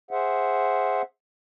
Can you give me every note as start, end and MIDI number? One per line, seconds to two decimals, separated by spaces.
0.11 1.02 68
0.11 1.02 72
0.11 1.02 76
0.11 1.02 78